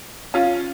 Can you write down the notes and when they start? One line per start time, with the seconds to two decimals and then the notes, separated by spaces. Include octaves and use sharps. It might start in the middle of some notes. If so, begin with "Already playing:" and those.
0.34 C#4 F4